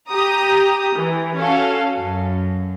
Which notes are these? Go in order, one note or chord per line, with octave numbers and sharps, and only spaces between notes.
G4 A#5 D#6
E3
C#4 F#4 A4 F5
F#2